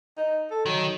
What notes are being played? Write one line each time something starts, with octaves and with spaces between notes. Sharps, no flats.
D#4
A4
D#3 F#3